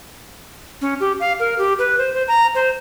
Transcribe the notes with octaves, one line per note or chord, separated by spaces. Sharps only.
C#4
G4
F5
A#4
G4
B4
C5
C5
A#5
C5